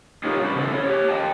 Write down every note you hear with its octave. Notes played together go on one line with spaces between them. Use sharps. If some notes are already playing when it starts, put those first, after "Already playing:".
D#4 F4 G4 G#4 A#4 C#5
G2 D4 F#4 A#4 B4
C#3 C4 E4 A4
G#4 C#5
G4 C#5
D#5 G5 A5